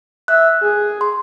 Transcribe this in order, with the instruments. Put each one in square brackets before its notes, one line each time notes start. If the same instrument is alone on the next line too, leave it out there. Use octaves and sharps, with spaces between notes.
[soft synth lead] E5 [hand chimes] F#6
[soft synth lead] G#4
[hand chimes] C6